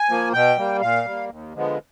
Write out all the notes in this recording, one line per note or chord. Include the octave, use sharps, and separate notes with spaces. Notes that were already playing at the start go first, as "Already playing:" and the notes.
Already playing: G#5
F3 A#3
B2 G5
G3 A#3
A#2 F5
G3
A#3
D#2
D3 F3 G#3 B3